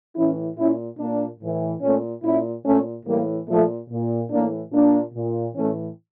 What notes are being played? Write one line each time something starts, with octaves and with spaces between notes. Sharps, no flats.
A2 E3 C#4 E4
A#2 C#4 E4
A#2 A#3 D4
A2 E3
A#2 A3 C#4
A#2 C#4 E4
A#2 A3 C#4
A2 E3 G3 A#3
A#2 F3 A3
A#2
A2 E3 A#3 D4
A#2 A#3 D4
A#2
A2 E3 A3 C#4